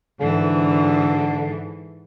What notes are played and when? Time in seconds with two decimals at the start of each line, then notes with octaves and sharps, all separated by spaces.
0.20 G#2 D3 E3